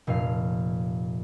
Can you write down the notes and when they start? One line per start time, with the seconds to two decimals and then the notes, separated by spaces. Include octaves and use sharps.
0.07 F1 A#2 A3 F5